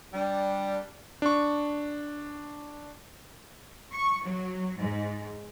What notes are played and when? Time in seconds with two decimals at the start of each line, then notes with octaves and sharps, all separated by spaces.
0.13 G3 D4
1.22 D4 C#6
3.92 C#6
4.24 F#3
4.78 G#2